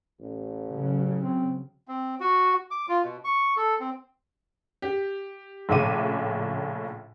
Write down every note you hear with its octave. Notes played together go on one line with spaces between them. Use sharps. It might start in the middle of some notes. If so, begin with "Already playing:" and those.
A1
C#3 F#3
C4
C4
F#4
D6
F4
B2
C#6
A4
C4
G4
A#1 A2 C#3 E5 D6 D#7